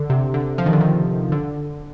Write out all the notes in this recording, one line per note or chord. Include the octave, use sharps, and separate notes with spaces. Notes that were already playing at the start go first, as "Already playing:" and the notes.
Already playing: D3
C3
D3
F3
D#3
D3
D#3
D3